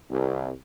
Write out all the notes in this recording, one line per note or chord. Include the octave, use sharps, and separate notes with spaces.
C2